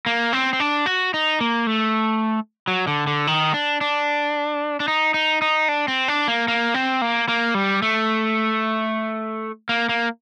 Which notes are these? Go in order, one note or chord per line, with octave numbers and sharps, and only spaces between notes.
A#3
C4
C4
D4
F#4
D#4
A#3
A3
F#3
D3
D3
D#3
D4
D4
D4
D#4
D#4
D#4
D4
C4
D4
A#3
A#3
C4
A#3
A#3
G3
A3
A#3
A#3